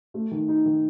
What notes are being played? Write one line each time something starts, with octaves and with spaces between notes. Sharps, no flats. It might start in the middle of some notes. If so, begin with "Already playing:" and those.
A3
D#3
D#4
D#3